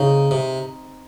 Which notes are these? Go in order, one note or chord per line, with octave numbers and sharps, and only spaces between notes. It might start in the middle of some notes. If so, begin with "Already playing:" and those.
Already playing: C#3 C4 D#4
C3